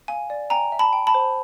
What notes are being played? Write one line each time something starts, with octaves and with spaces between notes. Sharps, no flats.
F5 G#5
D5
G5 G#5 A#5
E5
A5 B5
G5
A5 B5
C5